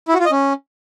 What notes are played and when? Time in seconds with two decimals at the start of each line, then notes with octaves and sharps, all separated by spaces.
0.08 E4
0.14 F#4
0.20 F4
0.26 D#5
0.31 C#4